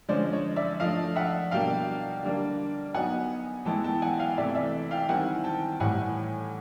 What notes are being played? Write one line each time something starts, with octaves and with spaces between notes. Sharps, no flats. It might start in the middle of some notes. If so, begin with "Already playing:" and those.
D3 F3 G#3 C#4 C5 D5
C#5 D#5
D5 E5
F3 A3 D4 D#5 F5
E5 F#5
B2 G3 A#3 D4 F5 G5
D3 G3 A#3 D4
F#3 B3 D#4 F#5 G#5
E3 G#3 B3 E4 G5 A5
G5 A5
F#5 G#5
F5 G5
C3 E3 A3 D5 E5
D5 E5
F5 G5
D#3 G3 C4 E4 F#5 G#5
G5 A5
A2 E3 G3 F#5 G#5